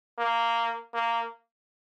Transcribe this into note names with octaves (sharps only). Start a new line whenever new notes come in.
A#3
A#3